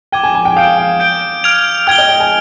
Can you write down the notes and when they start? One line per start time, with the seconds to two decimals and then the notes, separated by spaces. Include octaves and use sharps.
0.12 G5 D6 G#6 D#7 G7
0.24 G#5
0.35 G#5
0.45 G5
0.56 F5 D#6 G6 D7 G7
0.78 F5
1.00 G6 D7 G7
1.44 F6 G#6 D7 F7
1.87 G5 F6 G#6 D7 G7
1.98 D#5
2.09 G5
2.20 G#5